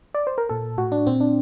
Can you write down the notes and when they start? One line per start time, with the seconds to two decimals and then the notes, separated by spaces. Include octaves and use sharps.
0.14 D5
0.27 C5
0.38 A#4
0.49 A#2 A4
0.78 A2 F#4
0.92 D4
1.07 A#2 C4
1.20 D4